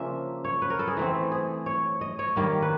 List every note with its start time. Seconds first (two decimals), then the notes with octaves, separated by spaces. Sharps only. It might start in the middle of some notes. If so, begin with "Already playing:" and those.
Already playing: C#3 F3 A#3 D4 E5
0.44 C#5
0.62 B4
0.70 A#4
0.79 A4
0.88 G#4
0.97 E3 A3 C4
1.31 G#4
1.66 C#5
2.01 D#5
2.19 C#5
2.36 D#3 G3 A#3
2.62 B4